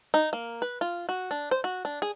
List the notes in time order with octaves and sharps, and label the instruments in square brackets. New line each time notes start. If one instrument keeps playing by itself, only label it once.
[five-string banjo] D#4
A#3
B4
F4
F#4
D4
C5
F#4
D4
G#4